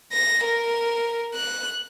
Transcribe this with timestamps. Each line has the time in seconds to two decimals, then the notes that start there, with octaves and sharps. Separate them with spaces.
0.12 A#6
0.45 A#4
1.35 F#6